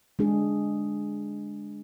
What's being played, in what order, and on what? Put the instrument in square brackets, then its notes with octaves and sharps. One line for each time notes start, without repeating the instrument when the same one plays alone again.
[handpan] G#3 D4 G#4